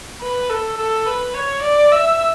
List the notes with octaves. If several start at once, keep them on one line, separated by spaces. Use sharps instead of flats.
B4
A4
A4
B4
C#5
D5
E5